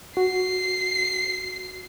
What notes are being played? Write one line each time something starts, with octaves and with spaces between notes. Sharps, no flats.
F#4 C7